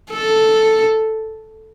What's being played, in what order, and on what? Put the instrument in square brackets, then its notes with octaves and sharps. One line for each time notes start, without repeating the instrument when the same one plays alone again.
[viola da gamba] A4